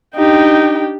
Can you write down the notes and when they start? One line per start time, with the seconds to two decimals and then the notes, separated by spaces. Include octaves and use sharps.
0.16 D4 D#4 G4 G5